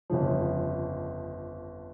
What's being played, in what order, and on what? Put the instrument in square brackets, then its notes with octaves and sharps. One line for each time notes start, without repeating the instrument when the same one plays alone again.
[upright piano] G1 F2 C#3 F3